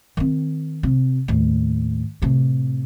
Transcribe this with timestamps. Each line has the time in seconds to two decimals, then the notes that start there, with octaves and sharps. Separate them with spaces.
0.17 D#3 C4
0.83 C3
1.28 D#2 A2
2.22 A2 C3